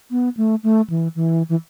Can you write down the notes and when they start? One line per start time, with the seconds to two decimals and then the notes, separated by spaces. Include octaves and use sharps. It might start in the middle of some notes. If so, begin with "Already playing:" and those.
0.11 B3
0.37 A3
0.63 A3
0.90 E3
1.15 E3
1.49 E3